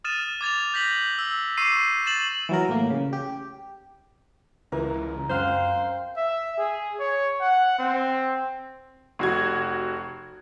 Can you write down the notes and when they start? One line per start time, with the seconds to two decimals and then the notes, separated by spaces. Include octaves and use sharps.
0.04 D#6 F6 A6 D#7 E7
0.41 D6 G#6 A6 F7
0.74 G6 A#6 B6 F#7
1.19 E6
1.57 C#6 D6 E6 C7 D#7
2.06 A6 E7 F#7
2.49 E3 F#3 A#4
2.69 A2 A#3
2.90 C#3
3.13 G4
4.72 C#2 E3 A#4
5.29 F#2 C4 C5 F5 F#5 F6
6.17 E5
6.58 G#4
6.99 C#5
7.41 F#5
7.78 C4
9.19 F1 F#4 G#6